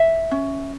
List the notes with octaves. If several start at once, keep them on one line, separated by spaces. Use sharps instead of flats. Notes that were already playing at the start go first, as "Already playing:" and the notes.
Already playing: E5
C#4